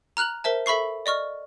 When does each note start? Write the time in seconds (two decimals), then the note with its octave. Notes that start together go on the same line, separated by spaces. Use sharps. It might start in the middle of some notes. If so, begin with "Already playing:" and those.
0.17 A#5 F6 F#6 F7 F#7
0.44 A#4 C5 E5 A5
0.66 A4 E5 B5 C#6 C7
1.06 D5 D#5 C#6 F6